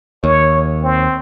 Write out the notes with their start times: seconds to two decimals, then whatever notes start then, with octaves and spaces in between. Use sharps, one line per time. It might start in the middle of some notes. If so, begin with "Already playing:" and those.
0.24 D#2 C#5
0.83 C4